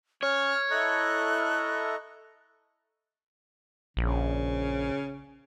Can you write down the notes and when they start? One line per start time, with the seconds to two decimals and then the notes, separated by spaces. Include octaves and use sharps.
0.23 C#4 C#5 F6
0.71 E4 A4 D#5 A#5 C#6 F#6
3.97 A#1 C#3